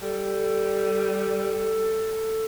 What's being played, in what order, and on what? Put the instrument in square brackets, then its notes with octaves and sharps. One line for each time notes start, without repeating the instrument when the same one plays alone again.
[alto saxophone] G3 [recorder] A4